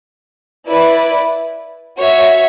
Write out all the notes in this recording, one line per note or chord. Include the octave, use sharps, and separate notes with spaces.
E4 B4 D5
F#4 C#5 E5